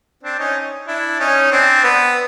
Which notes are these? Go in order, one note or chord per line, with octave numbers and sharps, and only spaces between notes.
C4 D4
C#4 D#4
D4 E4
C#4 D#4
C4 D4
B3